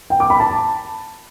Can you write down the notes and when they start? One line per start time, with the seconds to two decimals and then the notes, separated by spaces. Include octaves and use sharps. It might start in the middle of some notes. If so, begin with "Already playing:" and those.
0.10 G5
0.20 D6
0.30 B5
0.40 A5